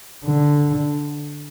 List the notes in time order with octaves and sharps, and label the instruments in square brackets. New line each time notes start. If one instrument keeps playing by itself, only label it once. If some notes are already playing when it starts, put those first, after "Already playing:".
[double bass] D3